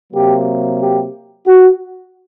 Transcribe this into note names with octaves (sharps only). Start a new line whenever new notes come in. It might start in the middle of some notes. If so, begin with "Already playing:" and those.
C3 F#3 A#3 G4
G4
F#4